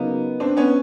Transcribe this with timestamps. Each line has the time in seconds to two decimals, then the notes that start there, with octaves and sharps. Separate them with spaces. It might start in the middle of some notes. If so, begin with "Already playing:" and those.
Already playing: C#3 F#3 A#3 B3 D#4
0.40 C4 D4
0.57 B3 C#4